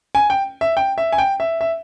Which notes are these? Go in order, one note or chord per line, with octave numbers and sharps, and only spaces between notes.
G#5
G5
E5
G5
E5
G#5
G5
E5
E5